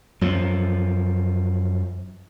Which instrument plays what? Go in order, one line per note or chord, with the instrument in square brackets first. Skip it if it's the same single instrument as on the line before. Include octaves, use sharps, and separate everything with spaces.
[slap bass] F#2 F3